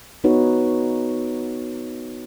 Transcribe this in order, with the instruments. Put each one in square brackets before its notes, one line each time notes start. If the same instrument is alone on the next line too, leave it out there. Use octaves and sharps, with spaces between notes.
[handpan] B3 D#4 F#4 B4 C#5